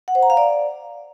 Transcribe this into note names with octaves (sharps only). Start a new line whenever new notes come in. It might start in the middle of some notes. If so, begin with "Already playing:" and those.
F#5
C5
A#5
F5
D5